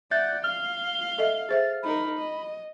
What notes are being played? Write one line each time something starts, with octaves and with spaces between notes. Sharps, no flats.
D5 E5 F#5 F#6 G6 A6
F5 F6 G7
A4 D#5 E5
G#4 C5 E5 A6
D#4 A#4 B5
D#5